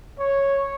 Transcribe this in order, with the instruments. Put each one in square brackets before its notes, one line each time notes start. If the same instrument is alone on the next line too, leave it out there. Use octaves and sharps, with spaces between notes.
[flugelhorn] C#5